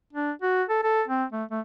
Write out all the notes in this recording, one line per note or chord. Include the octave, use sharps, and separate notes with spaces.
D4
F#4
A4
A4
C4
A3
A3